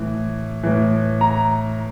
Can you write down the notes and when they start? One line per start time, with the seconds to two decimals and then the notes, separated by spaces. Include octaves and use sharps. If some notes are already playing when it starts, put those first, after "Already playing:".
Already playing: A2 E3
0.63 A2 E3
1.21 A#5